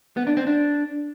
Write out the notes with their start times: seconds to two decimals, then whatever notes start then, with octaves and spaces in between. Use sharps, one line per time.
0.17 B3
0.27 D4
0.37 C4
0.47 D4